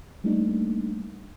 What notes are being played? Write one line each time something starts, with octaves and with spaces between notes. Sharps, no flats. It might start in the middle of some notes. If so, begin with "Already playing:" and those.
G3 A3 A#3 D4 D#4